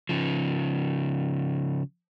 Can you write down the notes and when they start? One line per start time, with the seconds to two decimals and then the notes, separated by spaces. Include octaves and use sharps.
0.09 C#3 F3